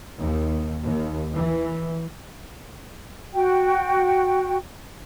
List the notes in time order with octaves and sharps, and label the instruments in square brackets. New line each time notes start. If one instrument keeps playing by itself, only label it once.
[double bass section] D#2
D#2
E3
[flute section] F#4 G5